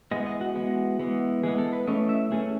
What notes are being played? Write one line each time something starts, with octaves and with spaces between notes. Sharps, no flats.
E3 G#3 B3 D#5
D#5
F#4
E3 G#3 B3
E3 G#3 B3
E3 G#3 B3 G#4
A4
B4
E3 A3 C#4 D#5
E5
E3 A3 C#4 G#4